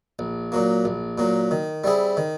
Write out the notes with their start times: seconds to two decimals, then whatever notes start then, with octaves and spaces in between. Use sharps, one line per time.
0.19 A#1
0.52 A#2 F#3 A#3
0.85 A#1
1.18 A#2 F#3 A#3
1.51 D#3
1.84 G3 C4 E4 G#4
2.17 D#3